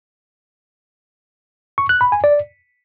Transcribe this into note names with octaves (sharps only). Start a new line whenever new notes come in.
C#6
F#6
B5
G#5
D5